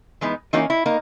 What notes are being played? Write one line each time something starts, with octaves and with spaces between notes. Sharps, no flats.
E3 G#3 B3 D#4
E3 A#3 C#4 D#4 F#4
E4
A#3 D#4